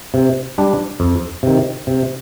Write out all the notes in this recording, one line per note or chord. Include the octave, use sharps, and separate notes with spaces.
C3
G3 D4
F2
C3 D#3
C3